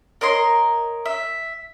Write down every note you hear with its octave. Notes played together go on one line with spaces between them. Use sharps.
A#4 C#5 D#5 C6
E5